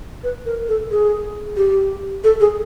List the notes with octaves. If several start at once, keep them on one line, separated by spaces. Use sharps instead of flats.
B4
A#4
A4
G#4
G4
A4
G#4